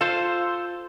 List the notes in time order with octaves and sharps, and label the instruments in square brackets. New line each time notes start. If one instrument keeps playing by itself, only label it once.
[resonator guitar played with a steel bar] F4 F5 [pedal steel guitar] A4 C5